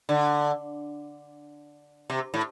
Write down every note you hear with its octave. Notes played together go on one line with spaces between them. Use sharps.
D3
C3
A2